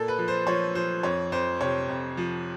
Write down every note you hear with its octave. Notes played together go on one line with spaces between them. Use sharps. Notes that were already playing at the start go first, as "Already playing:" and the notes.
Already playing: A#2 A4
B4
F3
C5
F3 C#5
F3 C5
F2 C#5
F2 C5
C3 C#5
F2
F3